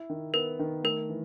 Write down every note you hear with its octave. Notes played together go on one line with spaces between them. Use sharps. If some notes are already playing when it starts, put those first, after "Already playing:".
Already playing: E4
D#3
B3 A#4
D#3
A3 A#4
E3